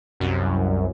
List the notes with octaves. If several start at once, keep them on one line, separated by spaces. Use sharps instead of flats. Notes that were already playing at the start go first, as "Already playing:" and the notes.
C2 F#2